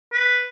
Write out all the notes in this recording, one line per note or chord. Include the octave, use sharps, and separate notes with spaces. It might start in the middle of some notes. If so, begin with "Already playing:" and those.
B4